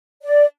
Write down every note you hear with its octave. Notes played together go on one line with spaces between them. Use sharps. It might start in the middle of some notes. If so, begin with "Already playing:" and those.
D5